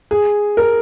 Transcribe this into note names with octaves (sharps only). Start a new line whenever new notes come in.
G#4
A#4